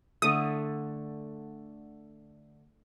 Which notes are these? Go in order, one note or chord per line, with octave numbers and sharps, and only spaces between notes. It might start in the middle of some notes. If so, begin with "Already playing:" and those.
D3 A3 D#6